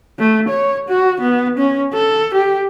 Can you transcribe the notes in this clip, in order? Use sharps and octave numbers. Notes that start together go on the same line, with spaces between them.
A3
C#5
F#4
B3
C#4
A4
G4